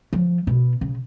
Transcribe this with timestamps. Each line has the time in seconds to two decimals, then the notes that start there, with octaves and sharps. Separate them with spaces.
0.13 F3
0.47 B2
0.81 C#3